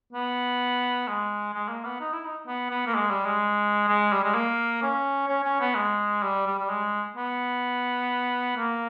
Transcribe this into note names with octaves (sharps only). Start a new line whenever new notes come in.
B3
G#3
G#3
A#3
B3
D#4
E4
D#4
B3
B3
A#3
G#3
G3
G#3
G#3
G3
G#3
A#3
C#4
C#4
C#4
B3
G#3
G3
G3
G3
G#3
B3
A#3